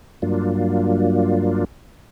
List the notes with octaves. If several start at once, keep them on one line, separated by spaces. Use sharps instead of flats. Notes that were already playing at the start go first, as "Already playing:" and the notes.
G2 F#3 A#3 D4 F4